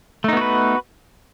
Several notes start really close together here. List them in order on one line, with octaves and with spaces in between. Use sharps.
A3 D#4 B3 F#4 B4